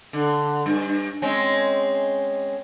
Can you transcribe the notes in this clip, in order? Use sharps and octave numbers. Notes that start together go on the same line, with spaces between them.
D3
G2
G#3 C4 C#4